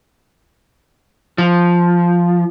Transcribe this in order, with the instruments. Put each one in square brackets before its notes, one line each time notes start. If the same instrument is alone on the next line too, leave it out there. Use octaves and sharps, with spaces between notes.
[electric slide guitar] F3